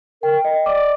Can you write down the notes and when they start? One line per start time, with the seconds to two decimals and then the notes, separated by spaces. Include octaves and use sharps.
0.22 A#4 G5
0.45 D#5
0.66 D5 D6